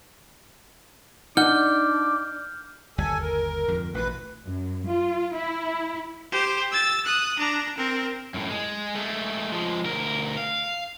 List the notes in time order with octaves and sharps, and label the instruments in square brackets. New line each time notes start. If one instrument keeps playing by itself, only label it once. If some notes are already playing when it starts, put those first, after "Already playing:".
[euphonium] D4 [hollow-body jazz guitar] D#4 F#5 [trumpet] D6 [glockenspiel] F6 G6 G7
[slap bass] G1 D#2 G3 [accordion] A4 G#5
[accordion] A#4
[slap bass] F2 G#2 D3
[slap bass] A1 B2 [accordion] B4
[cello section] F#2
F4
E4
[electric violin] G4 C5
E6 A6
D#6 F#6
D4 A#5
C4 A#4
[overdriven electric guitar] F#2 A2
G#3
G#3 A3
F3 G#3
D2 A#4
F5